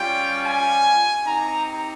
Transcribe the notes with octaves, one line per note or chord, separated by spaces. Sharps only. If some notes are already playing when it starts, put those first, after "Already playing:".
Already playing: G3 C#4 F4 G5
G#5
C4 D#4 G4 A#5